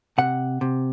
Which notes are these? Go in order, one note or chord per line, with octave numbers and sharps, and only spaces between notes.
C3 F#5
C3